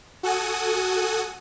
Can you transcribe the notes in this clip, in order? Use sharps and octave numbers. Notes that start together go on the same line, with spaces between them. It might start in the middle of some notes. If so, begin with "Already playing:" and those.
F#4 A4 F#5 G#5 D#6